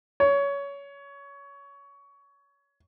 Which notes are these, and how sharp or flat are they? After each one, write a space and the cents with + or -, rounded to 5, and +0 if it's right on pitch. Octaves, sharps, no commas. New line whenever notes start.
C#5 +20